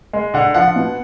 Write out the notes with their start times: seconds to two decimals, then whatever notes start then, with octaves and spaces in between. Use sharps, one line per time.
0.13 G#3
0.34 D3 F#5
0.54 F3 F#5
0.76 B2